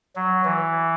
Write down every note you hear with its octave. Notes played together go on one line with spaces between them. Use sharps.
F#3
E3